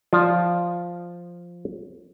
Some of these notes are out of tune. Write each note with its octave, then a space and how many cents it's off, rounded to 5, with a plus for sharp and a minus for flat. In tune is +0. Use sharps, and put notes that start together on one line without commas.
F3 +0 F4 +0 D5 +0